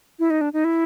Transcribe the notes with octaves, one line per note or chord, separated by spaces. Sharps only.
E4
D#4
D4
D#4
E4